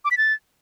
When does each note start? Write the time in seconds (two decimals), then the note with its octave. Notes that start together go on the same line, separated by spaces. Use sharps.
0.05 D6
0.11 B6
0.18 A6